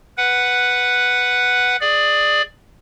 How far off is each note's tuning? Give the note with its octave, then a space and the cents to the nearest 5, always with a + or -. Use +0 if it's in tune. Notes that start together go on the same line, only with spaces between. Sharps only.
B4 +0 F#5 +0
G#4 +0 D5 +15